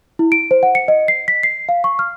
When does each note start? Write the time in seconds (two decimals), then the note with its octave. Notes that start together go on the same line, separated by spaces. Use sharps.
0.19 E4
0.32 D7
0.51 C5
0.63 F#5
0.75 C#7
0.88 D#5
1.08 C7
1.28 B6
1.43 C7
1.69 F5
1.84 C#6
1.99 F6